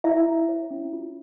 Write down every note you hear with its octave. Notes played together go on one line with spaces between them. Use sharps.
E4 E5
E4
C#5
C#4
F4